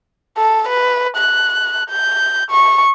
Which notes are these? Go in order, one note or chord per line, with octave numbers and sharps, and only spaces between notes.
A4
B4
F#6
G6
C#6